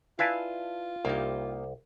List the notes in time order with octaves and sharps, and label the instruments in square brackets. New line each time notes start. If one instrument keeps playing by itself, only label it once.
[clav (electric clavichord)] E4 B4 D5 [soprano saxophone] F4 [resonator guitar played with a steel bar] F5 G#5 A5
[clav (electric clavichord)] C2 [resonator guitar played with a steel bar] A#3 D#4 G4